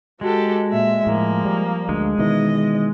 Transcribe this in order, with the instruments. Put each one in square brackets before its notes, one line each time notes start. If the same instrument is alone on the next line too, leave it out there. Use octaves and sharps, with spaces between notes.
[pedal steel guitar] G#3 [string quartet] F#4 G4 A4
[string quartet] A#2 E5
[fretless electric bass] A2 [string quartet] F3 A#3
[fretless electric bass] G3
[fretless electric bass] D2 [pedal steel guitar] G#3
[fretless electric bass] B2 D#3 E3 [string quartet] D#5